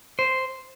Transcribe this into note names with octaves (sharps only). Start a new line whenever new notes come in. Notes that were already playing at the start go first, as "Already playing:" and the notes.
C5